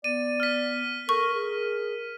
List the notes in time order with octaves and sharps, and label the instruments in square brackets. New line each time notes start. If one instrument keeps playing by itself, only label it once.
[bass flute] B3 [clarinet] D5 [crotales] D#7
[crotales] F6 B6
[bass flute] A4 [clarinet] A#4 [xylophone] C#6
[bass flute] G#4 [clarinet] A#4